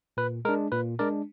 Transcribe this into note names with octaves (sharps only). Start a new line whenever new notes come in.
A#2 B4
G#3 D4 A#4
A#2 B4
G#3 D4 A#4 D5